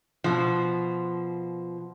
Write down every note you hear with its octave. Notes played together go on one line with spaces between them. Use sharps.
B2 F3